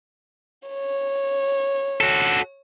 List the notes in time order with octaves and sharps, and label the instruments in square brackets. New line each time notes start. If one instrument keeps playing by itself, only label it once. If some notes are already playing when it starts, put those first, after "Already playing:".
[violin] C#5
[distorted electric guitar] F#4 A4